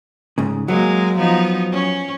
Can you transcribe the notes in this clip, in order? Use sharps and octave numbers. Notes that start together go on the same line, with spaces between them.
G#2 C#3
F#3 G#3 A#3 A#4
F3 B3 D#4
C#4